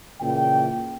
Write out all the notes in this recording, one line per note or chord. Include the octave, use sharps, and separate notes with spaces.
A#2 C#3 E3 G5